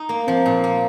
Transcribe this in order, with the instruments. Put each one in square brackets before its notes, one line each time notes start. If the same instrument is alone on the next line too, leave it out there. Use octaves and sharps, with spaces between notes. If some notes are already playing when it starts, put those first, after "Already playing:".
Already playing: [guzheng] D#4
A#3
[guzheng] F3 [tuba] C4
[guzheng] A#2
A#3